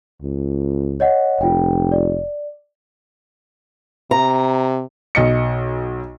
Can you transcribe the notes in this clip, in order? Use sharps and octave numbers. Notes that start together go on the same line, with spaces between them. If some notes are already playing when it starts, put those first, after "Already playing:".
C#2
C#5 D#5 F#5
F1 F4 G5
D5
C3 A#5
B1 D#5 C#7